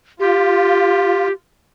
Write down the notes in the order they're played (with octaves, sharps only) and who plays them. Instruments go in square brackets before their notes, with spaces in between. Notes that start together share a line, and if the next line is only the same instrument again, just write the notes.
[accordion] F4 [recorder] G4